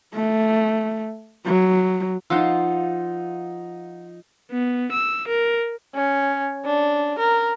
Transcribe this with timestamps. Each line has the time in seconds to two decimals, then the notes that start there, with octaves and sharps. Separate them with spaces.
0.14 A3
1.45 F#3
2.30 F3 D#4 F4 F#5 E6
4.51 B3
4.92 E6
5.28 A#4
5.94 C#4
6.65 D4
7.19 A#4